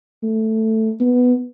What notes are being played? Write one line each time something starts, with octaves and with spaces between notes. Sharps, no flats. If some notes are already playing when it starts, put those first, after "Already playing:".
A3
B3